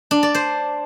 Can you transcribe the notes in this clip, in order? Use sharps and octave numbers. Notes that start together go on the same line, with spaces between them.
D4
D5
C5